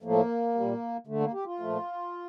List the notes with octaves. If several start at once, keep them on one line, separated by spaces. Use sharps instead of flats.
A2 F3 A3 A#3
G3
A#2
D3 A3
A#3
G4
F4
A#2 F3 A3